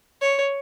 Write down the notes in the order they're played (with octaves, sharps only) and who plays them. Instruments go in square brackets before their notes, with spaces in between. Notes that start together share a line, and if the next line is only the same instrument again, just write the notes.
[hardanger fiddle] C#5